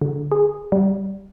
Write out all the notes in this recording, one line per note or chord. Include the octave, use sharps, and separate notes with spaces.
D3
G#4
G3